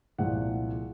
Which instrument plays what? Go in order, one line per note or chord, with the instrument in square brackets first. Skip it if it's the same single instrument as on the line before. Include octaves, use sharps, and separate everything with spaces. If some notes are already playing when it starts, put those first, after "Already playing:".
[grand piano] C2 A#2 F3 G#3 F#5